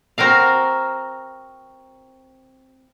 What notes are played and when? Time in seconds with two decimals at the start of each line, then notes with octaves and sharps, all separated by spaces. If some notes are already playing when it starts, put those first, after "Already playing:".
0.18 C4 F#4 A#4 F5